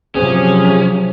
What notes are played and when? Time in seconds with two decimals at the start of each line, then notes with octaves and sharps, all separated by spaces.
0.15 C3 F3 F#3 C#4 G#4